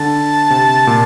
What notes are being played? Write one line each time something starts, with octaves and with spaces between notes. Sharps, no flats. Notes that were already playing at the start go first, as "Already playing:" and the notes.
Already playing: D3 A5
C3
A#2